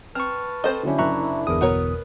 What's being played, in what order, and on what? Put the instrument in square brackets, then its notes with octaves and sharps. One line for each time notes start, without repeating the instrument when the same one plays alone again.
[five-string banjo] C4 [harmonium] B4 A5 [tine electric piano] C#6 F6
[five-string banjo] C4 C5 D#5 [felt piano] A4
[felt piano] D3 F#3 C#4 [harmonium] D4 E4
[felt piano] F#1 F#2 F#6 [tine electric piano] E5 A#5 C#6
[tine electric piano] G1 E2 D#6 [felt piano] G#4 A#4
[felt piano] B2 [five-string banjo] B3 A#4 C#5